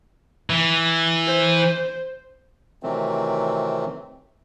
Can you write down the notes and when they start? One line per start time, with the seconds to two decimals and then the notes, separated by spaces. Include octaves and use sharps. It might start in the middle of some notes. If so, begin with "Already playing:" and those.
0.50 E3
1.27 C5
2.83 C3 D#3 E3 F#3 A3 C4